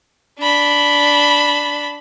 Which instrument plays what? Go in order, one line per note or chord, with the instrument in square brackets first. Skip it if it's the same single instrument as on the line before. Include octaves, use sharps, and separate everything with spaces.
[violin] D4 B5